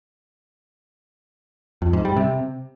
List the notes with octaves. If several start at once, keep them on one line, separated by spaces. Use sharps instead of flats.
F2
G#2
G3
C3